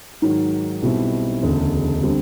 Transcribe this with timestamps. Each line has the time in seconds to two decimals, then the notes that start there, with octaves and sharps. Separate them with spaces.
0.22 G#2 D#3 F#3
0.82 B1 B2 G3 C4 E4
1.43 E1 D2 C#3
2.03 D3 G3 C4